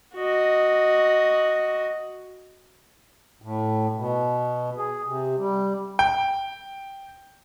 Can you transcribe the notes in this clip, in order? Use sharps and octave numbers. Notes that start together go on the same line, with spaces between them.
F#4 D#5
A2
B2
G#4
C3
G3
G5